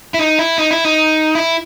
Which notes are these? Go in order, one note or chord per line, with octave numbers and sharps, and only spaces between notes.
E4
D#4
E4
D#4
E4
D#4
E4